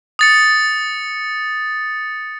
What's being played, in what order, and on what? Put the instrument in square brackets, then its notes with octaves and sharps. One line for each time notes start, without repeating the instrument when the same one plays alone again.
[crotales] D#6 A6 C#7